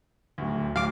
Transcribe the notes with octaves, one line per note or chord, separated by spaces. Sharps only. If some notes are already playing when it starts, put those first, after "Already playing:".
D1 D2
D1 F5 D6